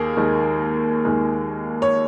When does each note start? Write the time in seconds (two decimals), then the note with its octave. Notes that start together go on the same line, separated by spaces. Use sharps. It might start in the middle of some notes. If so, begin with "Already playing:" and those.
Already playing: D#2 D#3 A#3 G#4 A#4
0.17 D#2 D#3 G#3
1.05 D#2 D#3 G#3
1.82 C#5